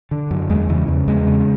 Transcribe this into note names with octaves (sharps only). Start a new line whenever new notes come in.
D3
F#2
E2 G#3
C#3 E3
E2
E2 G#3
C#3